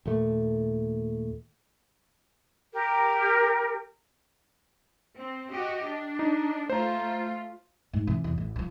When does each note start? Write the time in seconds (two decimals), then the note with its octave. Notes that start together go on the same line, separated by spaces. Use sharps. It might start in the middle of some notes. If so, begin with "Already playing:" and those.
0.06 D#2 A#2 A3
2.73 G4 A#4
5.17 C4
5.50 F#4 G4 D#5
5.86 D4
6.19 D#4
6.70 A3 F4 C5 A#5
7.93 G#2
8.07 C3 E3
8.24 E2
8.38 A1
8.56 D3 F3